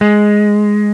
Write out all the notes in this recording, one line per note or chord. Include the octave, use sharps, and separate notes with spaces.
G#3